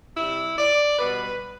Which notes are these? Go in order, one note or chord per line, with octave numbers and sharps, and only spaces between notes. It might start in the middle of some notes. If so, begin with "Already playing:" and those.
C3 G3 E4
D5
B2 G3 B4